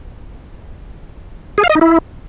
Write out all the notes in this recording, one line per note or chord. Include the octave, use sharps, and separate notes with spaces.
G#4
F5
D#5
D#4
E4